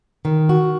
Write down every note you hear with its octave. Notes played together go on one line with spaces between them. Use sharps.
D#3
F#4